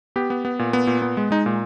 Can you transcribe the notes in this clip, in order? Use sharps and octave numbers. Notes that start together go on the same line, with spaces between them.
B3 G4
B3
B3
A#2
B3
A#2
B3
G#3
G#3 D#4
A#2